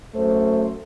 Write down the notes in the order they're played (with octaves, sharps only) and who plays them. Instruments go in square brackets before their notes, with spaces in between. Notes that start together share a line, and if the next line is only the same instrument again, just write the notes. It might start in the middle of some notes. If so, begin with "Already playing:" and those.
[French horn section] F#2 A3 C5